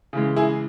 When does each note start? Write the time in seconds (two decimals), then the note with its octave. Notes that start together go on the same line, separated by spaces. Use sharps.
0.13 C#3 E3 G#3
0.36 E4 G#4